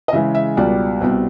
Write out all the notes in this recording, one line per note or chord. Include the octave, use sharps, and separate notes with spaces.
D#5
C#3 E3 G#3 E5
E5
C#2 B2 G3 D5
C2 B2 G3 C4